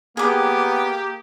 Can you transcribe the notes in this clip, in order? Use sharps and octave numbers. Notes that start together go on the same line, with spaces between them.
A#3 B3 G4 G#4 D6